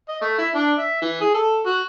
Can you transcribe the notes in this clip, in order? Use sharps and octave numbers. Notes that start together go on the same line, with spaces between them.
D#5
A3
E4
D4
E5
E3
G#4
A4
F#4